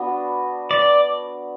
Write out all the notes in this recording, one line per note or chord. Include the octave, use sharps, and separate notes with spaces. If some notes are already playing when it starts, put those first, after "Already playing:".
Already playing: B3 D4 F#4
D5